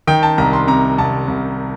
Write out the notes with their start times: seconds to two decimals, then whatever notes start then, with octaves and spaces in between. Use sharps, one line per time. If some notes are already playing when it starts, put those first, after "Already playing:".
0.07 D#3 G5
0.23 A5
0.38 C2 A#5
0.53 C6
0.68 C3 A#5
0.98 C2 A5
1.28 C2